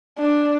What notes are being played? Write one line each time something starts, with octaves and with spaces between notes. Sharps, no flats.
D4